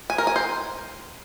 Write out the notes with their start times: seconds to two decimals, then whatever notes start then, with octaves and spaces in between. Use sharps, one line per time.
0.10 G#5
0.18 A#4
0.27 G#5
0.36 C5